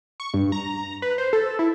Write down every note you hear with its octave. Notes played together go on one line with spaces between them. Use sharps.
C#6
G2
A#5
B4
C5
A4
E4